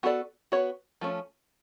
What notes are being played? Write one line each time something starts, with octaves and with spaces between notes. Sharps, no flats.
B3 F#4 A4 D5
B3 F#4 C#5
F3 A3 C#4